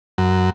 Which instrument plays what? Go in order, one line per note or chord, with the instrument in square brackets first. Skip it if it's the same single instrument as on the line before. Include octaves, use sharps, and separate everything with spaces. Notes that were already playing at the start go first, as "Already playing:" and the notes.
[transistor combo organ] F#2